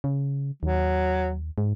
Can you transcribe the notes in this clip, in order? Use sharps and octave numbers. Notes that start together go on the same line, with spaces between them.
C#3
D#2 F#3
G#2